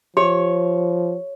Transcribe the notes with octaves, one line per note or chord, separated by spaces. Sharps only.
F3 G4 C#5